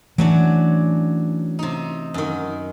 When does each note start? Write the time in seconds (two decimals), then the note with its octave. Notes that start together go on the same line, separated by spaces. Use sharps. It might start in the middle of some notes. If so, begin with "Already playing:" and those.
0.18 E3 F#3 A3 C#4 D4
1.59 C3 D#4
2.14 F#2 D#3